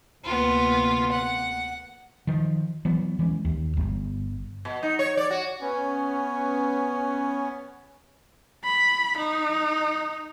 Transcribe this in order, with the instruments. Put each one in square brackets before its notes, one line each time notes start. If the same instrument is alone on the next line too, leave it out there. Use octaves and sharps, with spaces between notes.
[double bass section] D2 C3 A#3 [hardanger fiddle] B3 F4
[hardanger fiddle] F#5
[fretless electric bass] D#3 F3
E3 F#3 B3
E3 G#3 A#3 C#4
D#2
G1
[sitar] B2
D#4
C#5
D5
F#4
[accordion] B3 C#4
[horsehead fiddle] B5
D#4